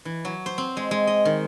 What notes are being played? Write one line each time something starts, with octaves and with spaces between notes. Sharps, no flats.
E3
F#3
C5
C4
G#3
G#3
D#5
D#3